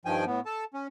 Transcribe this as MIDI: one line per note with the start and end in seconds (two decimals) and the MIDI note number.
0.05 0.25 43
0.05 0.25 51
0.05 0.25 53
0.05 0.25 79
0.05 0.25 80
0.26 0.40 45
0.26 0.40 59
0.46 0.64 69
0.46 0.64 81
0.74 0.87 61